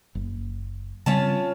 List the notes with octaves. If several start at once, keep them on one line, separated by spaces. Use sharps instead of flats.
F#1
C#3 G3 C4 C#4 F4 A5